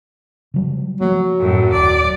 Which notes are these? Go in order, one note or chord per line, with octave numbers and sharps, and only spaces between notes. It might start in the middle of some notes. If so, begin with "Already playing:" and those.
C#3 F#3 G3
F3 F#3 A3 A#3
F#2 A2
D#1 D5